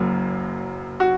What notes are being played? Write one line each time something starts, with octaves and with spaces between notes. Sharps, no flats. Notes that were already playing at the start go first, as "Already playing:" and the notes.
Already playing: F#1 F#2 F#3 A#3
F#4